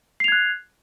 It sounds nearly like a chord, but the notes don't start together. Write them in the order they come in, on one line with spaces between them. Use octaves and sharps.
C7 F7 G#6 F#6